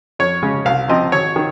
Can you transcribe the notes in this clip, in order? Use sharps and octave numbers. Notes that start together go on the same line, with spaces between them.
F2 C#5
C#3 G#3 C#4
C2 F5
C3 F3 C4 D#5
G#1 C#5
D#3